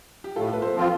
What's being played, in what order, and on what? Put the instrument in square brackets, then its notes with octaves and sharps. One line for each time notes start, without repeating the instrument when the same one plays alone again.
[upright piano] G4
[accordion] A2 [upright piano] F4 A4
[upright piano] B4
A4 C5
[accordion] F3 C4 F4